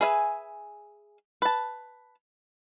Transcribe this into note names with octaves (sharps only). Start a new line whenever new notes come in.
G#4 B4 E5 G#5
B4 A5